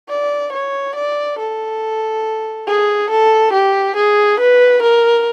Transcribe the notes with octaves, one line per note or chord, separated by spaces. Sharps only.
D5
C#5
D5
A4
G#4
A4
G4
G#4
B4
A#4